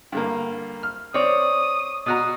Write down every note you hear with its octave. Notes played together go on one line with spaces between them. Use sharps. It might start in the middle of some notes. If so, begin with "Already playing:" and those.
G2 D3 A#3
F6
C4 C#5 D5 D#6
B2 F#4 A#5 D#6